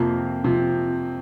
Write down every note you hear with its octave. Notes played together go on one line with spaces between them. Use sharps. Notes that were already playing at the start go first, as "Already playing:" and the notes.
Already playing: F2 C3 F3 A#3
C3 F3